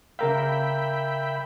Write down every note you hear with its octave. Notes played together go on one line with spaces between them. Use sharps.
C#3 A#4 E5 F5 G5 B5